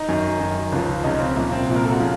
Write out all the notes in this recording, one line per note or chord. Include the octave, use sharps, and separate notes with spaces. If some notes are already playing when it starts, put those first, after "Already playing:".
Already playing: D#4
F#2 D#3
F#2 D#3
C#2 C#3 F3
C#2 C#3 F3 D#4
C#4
C4
C2 A#2 F3 A#3
C4
C2 A#2 F3
A#4
A4
F#4
C#3 F3 F4